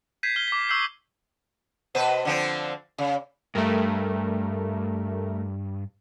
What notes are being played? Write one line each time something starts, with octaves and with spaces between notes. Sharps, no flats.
G6 G#6 B6 C7 D#7 E7
F6 B6 G7
D6 B6
C#6 E6 G6 C7
B2 B4 C5
D3 F3 C4
C#3
G2 A3 A#4